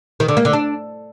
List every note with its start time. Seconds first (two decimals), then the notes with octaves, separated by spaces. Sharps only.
0.20 D#3
0.28 D3
0.37 A#3
0.45 D3
0.53 D4